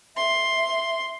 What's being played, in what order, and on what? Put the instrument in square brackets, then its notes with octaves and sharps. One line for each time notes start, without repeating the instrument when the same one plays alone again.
[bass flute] E5 [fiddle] C6